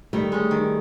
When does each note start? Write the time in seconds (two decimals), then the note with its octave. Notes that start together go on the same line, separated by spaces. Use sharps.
0.13 D#3 G3 A3
0.32 G#3 C#4
0.51 D#3